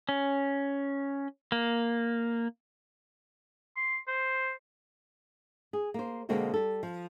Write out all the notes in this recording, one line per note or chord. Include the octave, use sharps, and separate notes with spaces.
C#4
A#3
C6
C5
G#4
A#3 C5
B2 D3 G#3 A#3 C4 F#4
G3 A4
F3